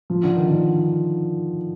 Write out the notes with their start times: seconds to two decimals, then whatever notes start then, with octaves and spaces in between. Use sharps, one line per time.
0.10 F3
0.23 D3
0.36 D#3
0.48 D3